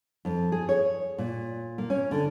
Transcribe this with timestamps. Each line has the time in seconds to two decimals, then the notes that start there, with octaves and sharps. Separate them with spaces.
0.25 F2
0.52 G#4
0.69 C#5
1.18 A#2
1.78 A#3
1.90 C#4
2.11 D3